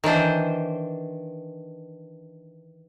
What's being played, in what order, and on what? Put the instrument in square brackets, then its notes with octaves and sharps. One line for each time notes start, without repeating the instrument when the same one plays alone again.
[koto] D#3 E3 D4 C5